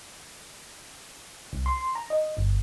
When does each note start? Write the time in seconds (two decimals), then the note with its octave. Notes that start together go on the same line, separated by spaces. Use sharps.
1.53 C2
1.66 C6
1.95 A#5
2.10 D#5
2.37 G1